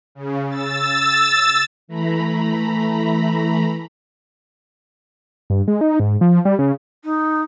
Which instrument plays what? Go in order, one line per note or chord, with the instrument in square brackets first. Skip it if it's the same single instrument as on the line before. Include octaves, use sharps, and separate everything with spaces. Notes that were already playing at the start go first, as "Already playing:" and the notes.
[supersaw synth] C#3
E6 A6
[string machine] E3 A3 A#5 B5
[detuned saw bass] G2
G#3
D#4
G#2
F3
G3
C#3
[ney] D#4